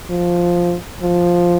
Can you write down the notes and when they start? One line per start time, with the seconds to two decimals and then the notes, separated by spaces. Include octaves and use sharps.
0.10 F3
1.02 F3